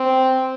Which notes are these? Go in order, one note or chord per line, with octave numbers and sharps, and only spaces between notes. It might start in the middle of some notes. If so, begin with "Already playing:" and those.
Already playing: C4